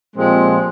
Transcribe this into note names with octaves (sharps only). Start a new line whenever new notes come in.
A#2 F3 G#3 C4 G4